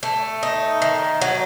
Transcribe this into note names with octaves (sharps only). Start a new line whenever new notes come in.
A3
D#4
D#3
F#3